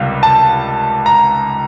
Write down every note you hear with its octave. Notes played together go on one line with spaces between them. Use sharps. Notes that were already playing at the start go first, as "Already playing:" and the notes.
Already playing: C#2 C3 D#3 G3
A5
A#5